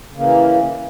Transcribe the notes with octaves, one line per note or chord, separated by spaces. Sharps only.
C#3 E3 A#3